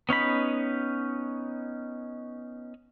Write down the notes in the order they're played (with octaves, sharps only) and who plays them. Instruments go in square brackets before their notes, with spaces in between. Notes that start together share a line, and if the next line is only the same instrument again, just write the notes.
[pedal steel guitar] B3 C#4 D#4 B5